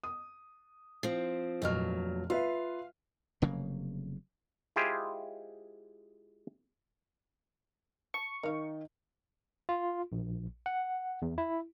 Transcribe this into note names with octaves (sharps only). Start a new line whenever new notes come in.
D#6
F3 C4
F1 G2 A#2 F#3 D#5 F6
F4 B4 E5 F5
F1 C#3 F#3 A#3
G#3 E4 F4 G4 G#4 C5
A5 C#6
D#3 D#4 A#4 F5
F4
A#1
F#5
E2
E4